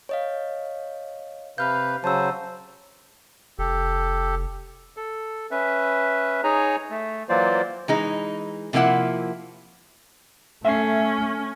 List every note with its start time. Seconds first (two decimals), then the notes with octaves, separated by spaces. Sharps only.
0.09 C#5 D#5 F5
1.58 C3 B4 F5 B5 F6 G6
2.04 C#3 F#3 C5 A5 E6
3.59 F1 G4 A4
4.97 A4
5.51 C#4 B4 E5
6.44 D#4 G#4 C#5 G#5 A#5
6.91 A3
7.29 E3 F#3 A#3 F4 C5 D5
7.88 E3 G#3 D#4
8.73 C3 F3 A#3 E4 F#5
10.64 A3 C#4 E5 C7